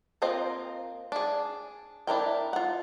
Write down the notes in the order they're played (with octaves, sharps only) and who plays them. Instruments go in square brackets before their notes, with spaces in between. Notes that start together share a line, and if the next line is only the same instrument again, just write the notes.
[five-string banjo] A#3 C4 F4 C5 D#5
D4 G#4
D4 E4 A#4 G5
F4 F#5